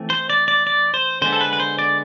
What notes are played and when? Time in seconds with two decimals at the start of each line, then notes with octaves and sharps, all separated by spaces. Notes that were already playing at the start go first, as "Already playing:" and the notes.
Already playing: E3 A3 C4
0.10 C5
0.30 D5
0.48 D5
0.67 D5
0.94 C5
1.22 D3 G#3 B3 C5
1.33 A4
1.41 B4
1.53 B4
1.60 C5
1.79 D5